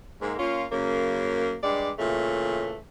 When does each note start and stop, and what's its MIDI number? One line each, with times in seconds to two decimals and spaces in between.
0.22 0.34 44
0.22 0.34 58
0.39 0.66 58
0.39 0.66 61
0.39 0.66 65
0.72 1.56 42
0.72 1.56 49
0.72 1.56 58
1.63 1.91 43
1.63 1.91 56
1.63 1.91 67
1.63 1.91 74
1.99 2.78 46
1.99 2.78 49
1.99 2.78 52
1.99 2.78 57